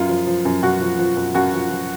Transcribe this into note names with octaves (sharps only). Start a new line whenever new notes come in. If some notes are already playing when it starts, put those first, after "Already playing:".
Already playing: F#2 F4
F3
F3
F#2
F#2 F#4
F3
F3
F#2
F#2 F#4
F3
F3